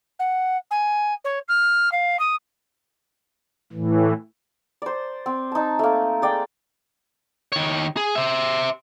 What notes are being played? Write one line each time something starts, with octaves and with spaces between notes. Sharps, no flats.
F#5
G#5
C#5
F6
F5
D#6
A2 E3
C5 D5
C4
D#4 A5
A3 A#3
G#4 D5 G5
D#3 C#5
G#4
C5 E5